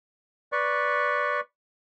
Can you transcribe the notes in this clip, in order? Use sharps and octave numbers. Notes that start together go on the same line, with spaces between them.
B4 D5 C#6